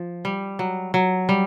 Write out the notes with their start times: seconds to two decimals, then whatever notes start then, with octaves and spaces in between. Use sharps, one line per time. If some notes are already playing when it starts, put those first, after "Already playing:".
Already playing: F3
0.25 G3
0.59 F#3
0.94 F#3
1.29 G3